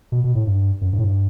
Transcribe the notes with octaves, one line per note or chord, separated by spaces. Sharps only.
B2
B2
A2
G2
F#2
G2
A2
G2